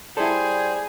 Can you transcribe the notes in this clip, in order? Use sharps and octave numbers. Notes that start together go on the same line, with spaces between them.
G3 E4 G#4 A4 C5